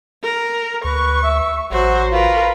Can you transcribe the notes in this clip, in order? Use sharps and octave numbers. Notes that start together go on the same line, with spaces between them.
A#4
D2 B4 C#6
E5
A1 F#3 F#4 C5
F4 A#4 B4